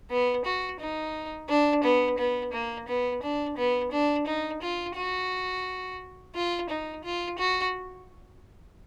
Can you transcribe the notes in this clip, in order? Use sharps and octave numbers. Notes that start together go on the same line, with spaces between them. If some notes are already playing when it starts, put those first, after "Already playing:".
B3
F#4
D#4
D4
B3
B3
A#3
B3
D4
B3
D4
D#4
F4
F#4
F4
D#4
F4
F#4